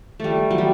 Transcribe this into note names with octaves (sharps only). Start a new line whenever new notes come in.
G3 A3
F#3
G3